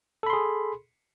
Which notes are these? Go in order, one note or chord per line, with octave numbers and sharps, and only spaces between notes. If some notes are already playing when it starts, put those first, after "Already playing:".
G#4 A4 B5 C6